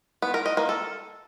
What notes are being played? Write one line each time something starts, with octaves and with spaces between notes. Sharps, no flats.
B3
A#4
D#5
A#3
A4